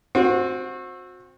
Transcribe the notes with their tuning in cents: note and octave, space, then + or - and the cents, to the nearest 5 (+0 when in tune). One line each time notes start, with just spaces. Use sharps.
C4 +10 F#4 -30